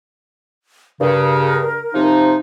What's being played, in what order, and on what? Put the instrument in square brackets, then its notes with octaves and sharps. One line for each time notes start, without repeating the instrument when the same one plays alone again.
[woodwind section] G2 C#3 [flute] A#4
[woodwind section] C3 F3 D#4